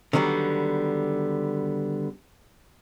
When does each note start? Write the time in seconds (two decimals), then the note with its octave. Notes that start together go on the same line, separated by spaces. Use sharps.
0.13 D3 D#3 F#3 G3 B3